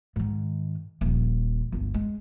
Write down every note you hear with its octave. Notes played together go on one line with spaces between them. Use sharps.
G#2 D#3
D#1 F3
G1 C#2
G#3